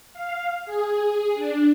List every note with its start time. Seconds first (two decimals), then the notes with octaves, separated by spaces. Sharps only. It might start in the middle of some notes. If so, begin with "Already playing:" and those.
0.13 F5
0.66 G#4
1.35 D4